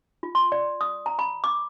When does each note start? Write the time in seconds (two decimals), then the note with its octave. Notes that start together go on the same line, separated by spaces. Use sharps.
0.23 F4
0.35 C6
0.52 D5
0.81 D#6
1.06 A#5
1.19 B5
1.44 D6